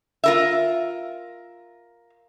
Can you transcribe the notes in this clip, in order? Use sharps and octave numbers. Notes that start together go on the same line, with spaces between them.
F4 A#4 E5